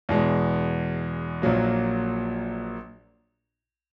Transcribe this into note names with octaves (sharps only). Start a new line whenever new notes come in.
E2 B2 G#3
A#1 A#2 F#3 A#3